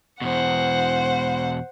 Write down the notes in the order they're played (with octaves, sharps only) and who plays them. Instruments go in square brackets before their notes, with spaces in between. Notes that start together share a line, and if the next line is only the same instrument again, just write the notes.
[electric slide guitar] E2 B2 [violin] C5 F#5